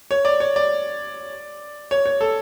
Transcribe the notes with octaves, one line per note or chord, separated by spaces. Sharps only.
C#5
D5
C#5
D5
C#5
C#5
A4